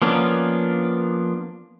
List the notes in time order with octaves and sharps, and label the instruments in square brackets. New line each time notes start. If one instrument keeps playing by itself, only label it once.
[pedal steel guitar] F3 A#3 B3 C#4 D4